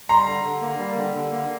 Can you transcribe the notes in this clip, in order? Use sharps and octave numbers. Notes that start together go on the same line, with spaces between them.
G3 A#5 C6
D3
D3
A#3
G3
D3
D3
A#3